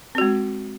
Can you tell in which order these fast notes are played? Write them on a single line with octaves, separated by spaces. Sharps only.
C4 F#4 G#3